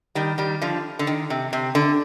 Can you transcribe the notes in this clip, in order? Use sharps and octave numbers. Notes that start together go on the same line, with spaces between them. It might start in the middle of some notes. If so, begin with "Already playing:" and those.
D#3 G3
D#3 G3
D3 F3
D3
D#3
C3
C3
D3